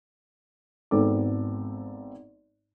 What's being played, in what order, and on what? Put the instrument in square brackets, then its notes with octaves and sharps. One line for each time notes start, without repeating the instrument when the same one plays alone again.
[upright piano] G#1 G#2 B3 C4 A4 D6